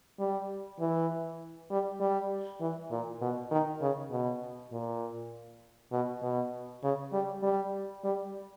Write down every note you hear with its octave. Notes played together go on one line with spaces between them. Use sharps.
G3
E3
G3
G3
E3
A#2
B2
D#3
C#3
B2
A#2
B2
B2
C#3
G3
G3
G3